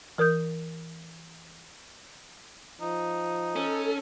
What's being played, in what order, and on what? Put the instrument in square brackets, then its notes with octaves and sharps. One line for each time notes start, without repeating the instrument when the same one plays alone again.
[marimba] E3 A#4 D#6 G6
[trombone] F3 [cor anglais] D#4
[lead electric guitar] C#4 [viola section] A4